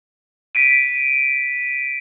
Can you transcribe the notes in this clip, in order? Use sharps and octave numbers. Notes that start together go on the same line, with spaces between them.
B6 D7 D#7